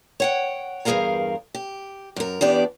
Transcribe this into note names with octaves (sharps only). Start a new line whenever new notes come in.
C#5 F#5 G5
E2 G2 G#4 A#4 F5 A#5
G4
F#2 A#4
E2 B3 D4 G4 D5